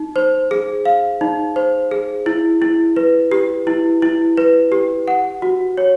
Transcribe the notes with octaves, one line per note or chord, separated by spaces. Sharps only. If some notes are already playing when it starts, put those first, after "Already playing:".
Already playing: D#4
C5
G#4
F5
D#4
C5
G#4
E4
E4
B4
G4
E4
E4
B4
G4
F#5
F#4
C#5